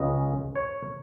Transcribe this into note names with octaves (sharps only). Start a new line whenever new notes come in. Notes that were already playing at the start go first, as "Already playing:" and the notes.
Already playing: C#2 C#3 G#3 D#5
C#5